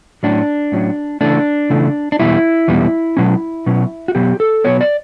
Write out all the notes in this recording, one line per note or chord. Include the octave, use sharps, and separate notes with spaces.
A2 F#3 C#4 D4
A2 F#3 C#4
C#3 E3 A3 D4
C#3 E3 A3
D4
E2 B2 G3 E4
E2 B2 G3
B2 F#3 C#4
B2 F#3 C#4
F#4
B2 F#3 B3 G4
A4
B2 F#3 B3 C#5
D5